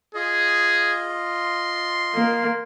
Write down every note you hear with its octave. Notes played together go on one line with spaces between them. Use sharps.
F4 G#4 D#5
C6
A#3